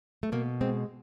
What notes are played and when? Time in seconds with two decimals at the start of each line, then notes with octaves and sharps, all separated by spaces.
0.23 A3
0.32 B2 A#3
0.61 G#3 C4